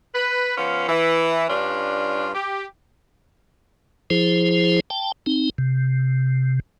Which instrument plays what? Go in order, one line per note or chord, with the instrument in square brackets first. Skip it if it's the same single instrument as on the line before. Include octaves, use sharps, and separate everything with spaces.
[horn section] B4
F3 B3 C#4 F4
E3
G2 C#4 D4 F4
G4
[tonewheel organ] F3 E4 G#4 C5
G5 A5
C4 D#4
C3